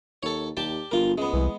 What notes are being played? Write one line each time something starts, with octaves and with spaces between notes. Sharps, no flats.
D#2 A4 C#5
D#2 G4 D5 A5
G1 F4 A#4
C#2 G#3 B3
C2 E3